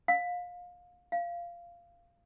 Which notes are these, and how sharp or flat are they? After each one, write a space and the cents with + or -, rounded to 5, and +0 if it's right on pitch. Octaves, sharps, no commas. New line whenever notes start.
F5 +25
F5 -15